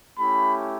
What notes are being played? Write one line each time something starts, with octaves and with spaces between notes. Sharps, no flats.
A3 C#4 E4 G4 B5